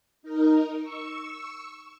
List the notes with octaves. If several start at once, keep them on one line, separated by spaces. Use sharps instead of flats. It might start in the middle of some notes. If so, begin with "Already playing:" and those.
D#4 A#4
C#6 E6